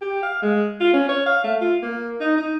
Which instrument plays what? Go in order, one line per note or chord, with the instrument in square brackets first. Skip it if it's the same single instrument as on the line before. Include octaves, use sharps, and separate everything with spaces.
[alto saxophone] G4
F5
G#3
F4
C#4
C#5
F5
A3
F4
A#3
D#4
D#4